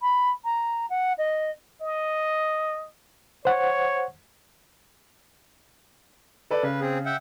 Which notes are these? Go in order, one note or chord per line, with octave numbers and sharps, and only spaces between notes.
B5
A#5
F#5
D#5
D#5
C5 C#5 F#5
A4 B4 D5
C#3 B4
C4 G#4
E5 F#5 G5